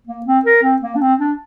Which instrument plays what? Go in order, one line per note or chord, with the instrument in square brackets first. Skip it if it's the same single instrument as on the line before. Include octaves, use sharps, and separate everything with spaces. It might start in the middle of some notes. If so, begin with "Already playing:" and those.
[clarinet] A#3
C4
A#4
C4
A#3
D4
C4
D4